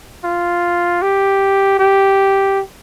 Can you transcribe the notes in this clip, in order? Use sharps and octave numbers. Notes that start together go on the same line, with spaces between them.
F4
G4
G4